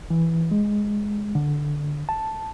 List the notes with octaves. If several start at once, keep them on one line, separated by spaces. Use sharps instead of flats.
E3
G#3
D3
A5